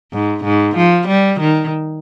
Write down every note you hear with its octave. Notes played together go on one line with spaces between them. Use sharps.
G#2
G#2
F3
G3
D#3